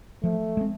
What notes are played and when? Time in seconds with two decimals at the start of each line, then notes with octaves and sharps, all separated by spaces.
0.23 F3 A3
0.57 G#3 C4